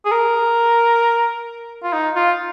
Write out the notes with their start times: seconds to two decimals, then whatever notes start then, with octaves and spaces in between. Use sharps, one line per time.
0.05 G#4
0.12 A#4
1.83 F4
1.93 D#4
2.16 F4